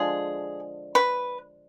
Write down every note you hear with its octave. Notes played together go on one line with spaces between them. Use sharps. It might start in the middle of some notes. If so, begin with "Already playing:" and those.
Already playing: D3 F3 G#3 G#4
B4